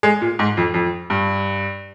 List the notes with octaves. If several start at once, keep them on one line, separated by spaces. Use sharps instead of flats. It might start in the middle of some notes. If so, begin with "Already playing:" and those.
G#3
A#2
G#2
F2
F2
G2